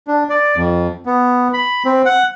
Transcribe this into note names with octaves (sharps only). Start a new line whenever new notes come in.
D4
D5
F2
B3
B5
C4
F#5